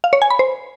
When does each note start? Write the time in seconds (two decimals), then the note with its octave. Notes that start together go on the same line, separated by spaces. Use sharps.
0.04 F5
0.13 C#5
0.22 G#5
0.30 B5
0.39 C5